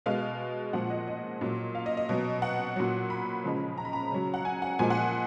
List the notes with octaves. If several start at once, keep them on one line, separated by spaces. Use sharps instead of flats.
B2 G#3 F5
A#2 F3 G#3 F#5
D#5
D#5
A#2 F#3
F5
D#5
D#5
B2 F#3
F#5
A#2 F#3
B5
C#3 F3 G#3
A#5
B5
A#5
C#3 F#3
F#5
G#5
F#5
A#2 F3 G#3 G#5
F#5